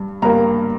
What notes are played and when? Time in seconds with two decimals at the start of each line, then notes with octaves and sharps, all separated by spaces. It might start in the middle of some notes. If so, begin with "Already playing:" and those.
Already playing: G2
0.22 G2 G3 A#3 A#5